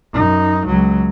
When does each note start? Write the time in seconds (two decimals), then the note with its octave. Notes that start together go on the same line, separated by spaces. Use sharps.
0.13 F#2 D#4
0.67 C#2 F#3